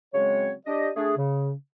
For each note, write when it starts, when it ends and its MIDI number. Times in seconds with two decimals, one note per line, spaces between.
0.15 0.53 49
0.15 0.53 54
0.15 0.53 56
0.15 0.53 60
0.15 0.53 73
0.67 0.90 62
0.67 0.90 67
0.67 0.90 75
0.97 1.17 57
0.97 1.17 62
0.97 1.17 68
1.18 1.52 49